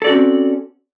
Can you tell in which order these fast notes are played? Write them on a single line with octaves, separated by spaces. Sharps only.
A4 D5 F#4 C#4 C4